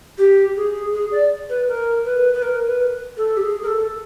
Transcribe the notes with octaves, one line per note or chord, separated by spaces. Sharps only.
G4
G#4
G#4
D5
B4
A#4
B4
B4
A#4
B4
A4
G4
G#4
A#4
A4